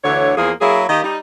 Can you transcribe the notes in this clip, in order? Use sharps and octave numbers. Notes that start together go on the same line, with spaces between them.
D2 D3 E3 C#5
E2 F3 A#3 G#4
F#3 A#3 E4 G#4
D#3 A#3 G4 D#5
G3 D#4